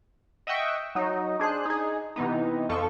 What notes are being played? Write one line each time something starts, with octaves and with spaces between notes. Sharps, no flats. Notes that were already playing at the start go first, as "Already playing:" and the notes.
D#5 E5 F#5 G5 C#6 E6
F#3 D#4
D4 G#4 C5 F#6
D#4 G#4
C3 E3 B3 D#4
F2 F3 F4 A4 C#6